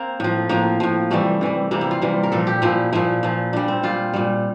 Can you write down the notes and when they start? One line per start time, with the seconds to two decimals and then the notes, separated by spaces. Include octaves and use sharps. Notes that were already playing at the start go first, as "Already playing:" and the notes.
Already playing: A#3 C4
0.20 A2 F3
0.49 A2 F3 A#3
0.80 A2 F3
1.11 C3 E3 G3 A3
1.41 C3 E3 G3
1.71 C3 E3 G3 A#3
1.81 E4
1.91 F4
2.02 C3 E3 G3
2.23 A#4
2.32 A#2 F3 A4
2.47 G4
2.62 A#2 F3 E4
2.93 A#2 F3 E4
3.23 A#2 F3
3.53 A#2 G3 D4
3.68 C4
3.83 A#2 G3 F4
4.13 A#2 G3